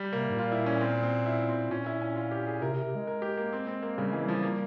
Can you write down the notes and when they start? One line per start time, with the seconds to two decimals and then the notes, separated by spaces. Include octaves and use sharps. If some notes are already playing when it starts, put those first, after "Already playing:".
Already playing: G3
0.12 C3 A#3
0.30 G#2
0.35 A#2 F4
0.52 E4
0.66 C#4
0.81 C4
1.03 C4
1.26 E4
1.48 C4
1.71 A#2 C#4
1.86 E4
2.02 C#4
2.16 F4
2.31 G4
2.47 G#4
2.62 C3 A#4
2.73 C3
2.84 C3
2.96 G#3
3.07 A#4
3.22 G4
3.37 A#3
3.53 C4
3.67 C4
3.83 A#3
3.98 C#3 G3
4.11 E3 G#3
4.25 F3 G3
4.43 A#3